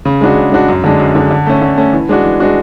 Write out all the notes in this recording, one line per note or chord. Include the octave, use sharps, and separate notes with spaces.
C#3
G#3 D4 F#4
C#3
G#3 D4 F#4
F#2
D3 G#3 D4
F#2
D3 G#3 D4
D3
A3 C#4
D3
A3 C#4
E3
G#3 D4 F#4
E3
G#3 D4 F#4